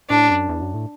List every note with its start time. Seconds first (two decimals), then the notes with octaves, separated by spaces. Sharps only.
0.10 A2 D4
0.30 F#2
0.49 E2
0.62 F#2
0.74 A2